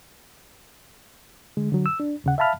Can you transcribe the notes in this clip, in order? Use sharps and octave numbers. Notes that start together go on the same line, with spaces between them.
D3 G#3
D3 F#3
E6
D4
D#2 C#3 F#5
E5 F5 A5 B5 F6